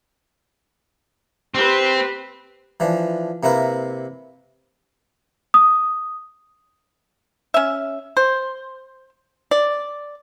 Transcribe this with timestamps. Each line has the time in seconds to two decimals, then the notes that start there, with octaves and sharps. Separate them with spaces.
1.55 C4 G4 B4
2.80 E3 F3 D4
3.43 C3 A#3 E4 A#4 B4
5.54 D#6
7.54 C#4 E5
8.17 C5
9.51 D5